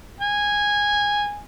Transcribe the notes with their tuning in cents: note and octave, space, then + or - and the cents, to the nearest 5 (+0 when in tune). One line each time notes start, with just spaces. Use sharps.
G#5 -10